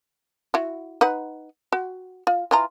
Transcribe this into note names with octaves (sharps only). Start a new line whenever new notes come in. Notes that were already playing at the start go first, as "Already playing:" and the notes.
E4 F#4
D#4 B4 F#5
F#4
F4
E3 F4 A#5